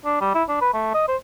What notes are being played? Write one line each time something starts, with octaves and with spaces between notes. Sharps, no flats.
D4
G3
E4
D4
B4
A3
D#5
C5